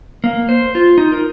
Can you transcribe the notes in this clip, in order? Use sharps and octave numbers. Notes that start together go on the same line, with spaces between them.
A#3
C5
F4
D#4
A#4